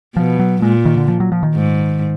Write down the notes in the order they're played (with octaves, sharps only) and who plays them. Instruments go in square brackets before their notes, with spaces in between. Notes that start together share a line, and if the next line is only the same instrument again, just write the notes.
[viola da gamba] B2 [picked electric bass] F3
[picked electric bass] F#3
[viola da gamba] A#2 [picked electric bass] G#3
[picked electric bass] D#3
D3
F3
F#3
F3
D#3
[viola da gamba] G#2